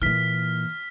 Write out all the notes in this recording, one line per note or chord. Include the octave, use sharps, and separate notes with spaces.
A#2 E3 F6 B6